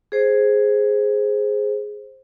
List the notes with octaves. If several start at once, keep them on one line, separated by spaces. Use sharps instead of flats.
G#4 C5